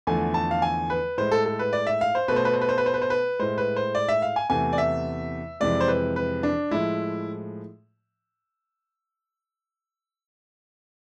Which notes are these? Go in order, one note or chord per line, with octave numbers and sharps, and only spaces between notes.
E2 D3 F3 A3 G#5
A5
F5
G#5
B4
A2 G#3 C5
A4
A4
B4
D5
E5
F5
C5
B2 A3 B4
C5
B4
C5
B4
C5
B4
C5
B4
C5
B4
A2 G#3 C5
B4
C5
D5
E5
F5
G#5
E2 C3 E3 A3 G#5
D5
E5
F2 C3 E3 G#3 D5
C5
B4
B4
D4
A2 F3 G#3 E4